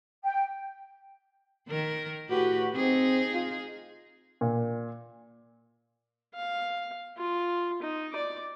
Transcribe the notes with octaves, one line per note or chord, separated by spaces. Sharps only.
G5
D#3 A#4
A2 F#4 G4 B4
C4 D#4 G#4
F4
A#2
F5
F4
D#4
D5 D6